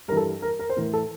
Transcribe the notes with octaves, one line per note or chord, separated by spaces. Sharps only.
G2 E3 A4 A#4
A#4
A#4
C5
A2 E3 A#4
A4